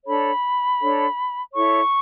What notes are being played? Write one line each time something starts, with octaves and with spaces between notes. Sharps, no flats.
D4 A4 C#5 B5
D4 A4 C#5
E4 A4 C#5 C#6